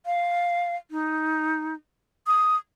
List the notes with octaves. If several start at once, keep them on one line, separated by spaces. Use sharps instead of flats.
F5
D#4
D#6